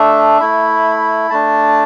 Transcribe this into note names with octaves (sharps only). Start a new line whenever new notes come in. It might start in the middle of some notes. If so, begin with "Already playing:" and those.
Already playing: A3 D4 E5
A3 E4 B5
A3 D4 A5